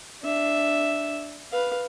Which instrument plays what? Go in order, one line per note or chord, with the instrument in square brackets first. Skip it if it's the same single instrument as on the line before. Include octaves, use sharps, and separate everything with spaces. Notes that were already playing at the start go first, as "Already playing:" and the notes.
[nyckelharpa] D4 E5
B4 F5